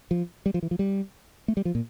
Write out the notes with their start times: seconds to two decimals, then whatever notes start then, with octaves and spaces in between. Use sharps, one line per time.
0.11 F3
0.46 G3
0.54 F3
0.63 E3
0.71 F3
0.79 G3
1.48 A3
1.57 G3
1.65 F3
1.75 A#2